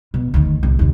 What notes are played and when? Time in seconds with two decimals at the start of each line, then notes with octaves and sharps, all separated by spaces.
0.14 B2
0.34 D2 D#3
0.63 C2 A2
0.79 D#2 C3